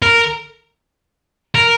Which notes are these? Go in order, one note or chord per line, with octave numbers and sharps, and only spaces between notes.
A#4
A#4